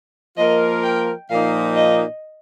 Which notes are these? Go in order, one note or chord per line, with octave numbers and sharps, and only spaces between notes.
F3 A#3 F4 A#4 D#5
G5
A#2 F3 A#3 D#4 F5
D#5